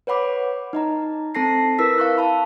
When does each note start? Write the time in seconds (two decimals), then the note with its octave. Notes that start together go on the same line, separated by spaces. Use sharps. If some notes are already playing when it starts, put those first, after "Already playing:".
0.07 B4 C#5 F#5 B5 D6
0.73 D#4 D#5 A#5
1.35 C4 A4 A5 A#6 C7
1.79 E4 A#4 B4 E6 B6
1.98 F5 C#6 F#6
2.18 F5 A5 B5